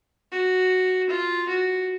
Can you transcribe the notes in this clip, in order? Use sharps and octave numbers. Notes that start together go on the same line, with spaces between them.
F#4
F4
F#4